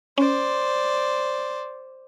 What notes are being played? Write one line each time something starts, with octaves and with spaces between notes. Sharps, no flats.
C#4 C5 D5